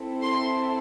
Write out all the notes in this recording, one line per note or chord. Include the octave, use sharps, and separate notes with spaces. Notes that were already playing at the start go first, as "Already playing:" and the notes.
Already playing: C4 E4 A4
C6